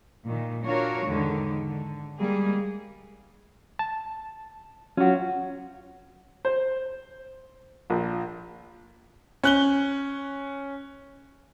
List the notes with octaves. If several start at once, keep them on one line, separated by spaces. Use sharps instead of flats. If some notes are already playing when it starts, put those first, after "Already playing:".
A#2 D#3
D4 F4 F#4 A#4 C#5
E2 G#2 D3 D#3
D3
G3 G#3 A#3 G#4
A5
F#3 C#4 F4 F#4
C5
A#1
C#4 F#6 G7